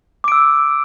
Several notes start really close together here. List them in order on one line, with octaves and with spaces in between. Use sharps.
D6 D7 E6